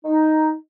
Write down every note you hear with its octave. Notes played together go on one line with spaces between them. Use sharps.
D#4